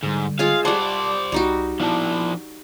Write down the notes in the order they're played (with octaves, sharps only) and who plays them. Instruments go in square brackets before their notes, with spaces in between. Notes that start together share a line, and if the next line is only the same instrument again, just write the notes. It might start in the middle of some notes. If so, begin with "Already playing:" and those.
[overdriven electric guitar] G#2 [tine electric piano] D3 G3
[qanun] G#3 F4 G#4 [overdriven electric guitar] F5
[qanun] G3 F#5 [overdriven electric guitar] C5 D5 [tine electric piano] A5
[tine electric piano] C2 [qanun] G3 D#4 F#4
[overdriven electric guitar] F3 D4 [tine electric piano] B3 E4 A5